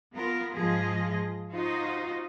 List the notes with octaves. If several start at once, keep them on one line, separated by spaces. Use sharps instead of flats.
B3 F4 A#4
G#2 F3 F4 G#4 D#5
D#4 F4 F#4 C5 D#5